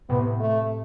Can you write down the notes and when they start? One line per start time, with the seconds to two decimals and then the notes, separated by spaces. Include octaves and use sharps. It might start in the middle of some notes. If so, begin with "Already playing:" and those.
0.09 A2 C3 B3
0.40 A3